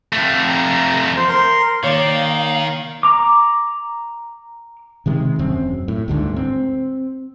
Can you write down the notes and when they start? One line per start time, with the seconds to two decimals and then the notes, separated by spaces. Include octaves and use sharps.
0.13 F2 A3
0.49 A#5
1.17 C5
1.29 A#4 C6
1.83 D#3 A#3 C#5 D5 F5
3.03 A#5 D6
5.06 C3 D#3 G#3
5.39 E1 F#2 C4
5.88 A2
6.08 G1 D2 G#2 D3
6.36 C4